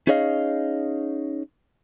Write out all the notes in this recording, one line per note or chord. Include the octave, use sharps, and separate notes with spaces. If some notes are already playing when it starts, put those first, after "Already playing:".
C#4 D#4 G#4 C#5 D#5 F5